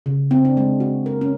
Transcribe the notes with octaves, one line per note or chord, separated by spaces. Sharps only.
C#3
C4
D4
G#3
F#4
A#4
C#4